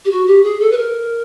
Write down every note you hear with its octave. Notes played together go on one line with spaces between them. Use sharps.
G4
F#4
G4
G#4
A4
B4
A#4